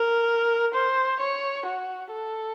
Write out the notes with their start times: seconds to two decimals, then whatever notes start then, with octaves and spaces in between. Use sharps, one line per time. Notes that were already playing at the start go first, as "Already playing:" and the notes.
Already playing: A#4
0.74 C5
1.20 C#5
1.66 F#4
2.12 A4